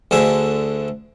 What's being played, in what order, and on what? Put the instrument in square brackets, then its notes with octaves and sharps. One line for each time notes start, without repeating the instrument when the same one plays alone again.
[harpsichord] D2 D3 G#4 E5